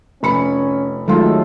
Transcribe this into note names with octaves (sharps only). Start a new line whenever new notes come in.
F1 C#4 B5 C#7
D#3 F#3 G#3 A3 F4 A4